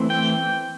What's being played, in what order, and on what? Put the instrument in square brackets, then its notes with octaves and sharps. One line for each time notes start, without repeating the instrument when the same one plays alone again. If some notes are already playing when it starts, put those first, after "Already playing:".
Already playing: [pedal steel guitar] E3 A3 C4
G5